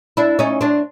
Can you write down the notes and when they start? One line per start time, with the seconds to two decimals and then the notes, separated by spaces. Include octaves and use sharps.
0.17 D4 E4
0.39 C#4 D#4
0.61 C4 D4